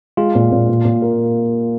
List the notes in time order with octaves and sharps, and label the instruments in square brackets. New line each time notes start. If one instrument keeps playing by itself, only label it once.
[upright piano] G#3 [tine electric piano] F4
[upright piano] A#2
A#2
A#2
A#2
A#3